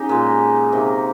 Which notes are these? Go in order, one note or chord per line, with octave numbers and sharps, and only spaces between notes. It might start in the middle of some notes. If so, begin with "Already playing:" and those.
Already playing: C#3 D#4 G4
A#2 G#3
C3 D#3 A#3